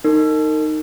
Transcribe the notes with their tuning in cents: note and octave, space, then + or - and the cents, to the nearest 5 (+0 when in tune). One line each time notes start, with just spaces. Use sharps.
D#4 +0 A#4 -35